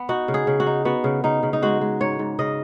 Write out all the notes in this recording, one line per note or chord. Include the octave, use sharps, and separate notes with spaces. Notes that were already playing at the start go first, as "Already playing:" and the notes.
Already playing: B3
D#4 F#4
C#3
G#4
C#3
F#4
D#4
B3 F#4
C#3
C#3 D#4
C#3
D#4
G#3 F#4
G#3
G#2 C#5
G#2
C#3 D#5